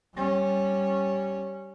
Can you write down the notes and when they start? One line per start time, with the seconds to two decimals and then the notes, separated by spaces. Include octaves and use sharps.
0.15 G3 C#4